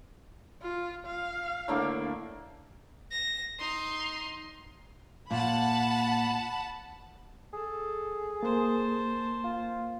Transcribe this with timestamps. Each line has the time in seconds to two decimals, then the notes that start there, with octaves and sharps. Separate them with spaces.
0.62 F4
1.06 F5
1.68 A2 D3 A#3
3.11 A#6
3.59 D#4 C6
5.31 A#2 F#5 A5 B5
7.54 G#4 A4
8.43 A#3 C5 A5
9.44 F4